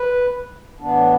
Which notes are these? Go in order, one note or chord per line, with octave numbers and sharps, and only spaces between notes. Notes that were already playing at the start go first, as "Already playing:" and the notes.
Already playing: B4
A2 E3 B3 D4